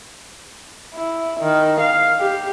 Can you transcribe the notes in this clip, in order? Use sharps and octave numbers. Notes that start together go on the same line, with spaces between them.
E4
D#3
F5
G4